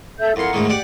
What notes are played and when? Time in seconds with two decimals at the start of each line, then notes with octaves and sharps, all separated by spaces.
0.20 A4 E5 G6
0.36 F2 E4 A#4 F#5 C6
0.53 D2 G#2 D#3
0.70 G4 D5 F#5